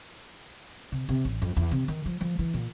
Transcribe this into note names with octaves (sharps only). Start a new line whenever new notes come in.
C3
C3
A1
F2
E2
C3
D#3
F3
F3
E3
A#2